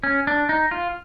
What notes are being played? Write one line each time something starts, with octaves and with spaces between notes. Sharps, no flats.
C#4
D4
D#4
F4